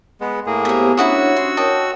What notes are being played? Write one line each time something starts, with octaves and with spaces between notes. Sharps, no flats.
G#3 B3
A2 A#3 G#4
B3 G4 C5 C#5 E5
C#4 D4 E4 F#4 C#5 F#5 D#6 E6
C6
A#4 C#5 D#5 G5 A5